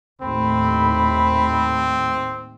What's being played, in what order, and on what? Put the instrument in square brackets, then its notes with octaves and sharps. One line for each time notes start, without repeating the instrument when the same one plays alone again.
[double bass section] D#2 A2 A3 [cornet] C4 [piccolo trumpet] B5